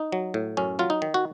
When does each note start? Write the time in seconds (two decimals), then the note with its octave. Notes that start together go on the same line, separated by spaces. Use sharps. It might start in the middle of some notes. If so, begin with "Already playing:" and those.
Already playing: D#4
0.12 F#3
0.34 A2
0.57 F#2 C#4
0.79 F#3 F4
0.90 D#4
1.02 D#3
1.14 F#4